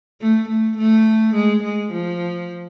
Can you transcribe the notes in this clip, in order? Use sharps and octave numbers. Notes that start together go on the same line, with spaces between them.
A3
A3
A3
G#3
G#3
F3